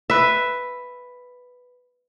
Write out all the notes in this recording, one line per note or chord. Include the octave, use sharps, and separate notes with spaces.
B4 E5